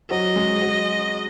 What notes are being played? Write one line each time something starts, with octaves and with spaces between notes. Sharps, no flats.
F#3 F#4 D#5
G#3 G#4
F#3 F#4